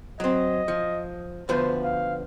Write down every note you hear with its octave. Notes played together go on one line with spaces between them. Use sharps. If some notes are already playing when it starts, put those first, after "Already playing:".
F#3 C4 D#5
F3
D2 F3 B3 C5
F5